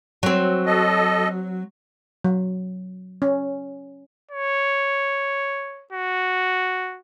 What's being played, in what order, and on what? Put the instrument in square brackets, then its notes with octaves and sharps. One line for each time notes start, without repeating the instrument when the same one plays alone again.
[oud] F#3 C4
[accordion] A4 D#5
[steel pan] F#3
C#4
[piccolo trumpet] C#5
F#4